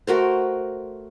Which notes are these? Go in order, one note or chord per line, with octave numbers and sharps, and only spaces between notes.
A3 F#4 A#4 C5